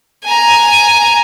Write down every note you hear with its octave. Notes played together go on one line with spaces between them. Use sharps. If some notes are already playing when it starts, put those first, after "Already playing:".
G#5 A#5